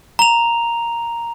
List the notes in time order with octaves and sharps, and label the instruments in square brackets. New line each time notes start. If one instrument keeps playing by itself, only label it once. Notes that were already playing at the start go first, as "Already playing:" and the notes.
[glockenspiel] A#5 F7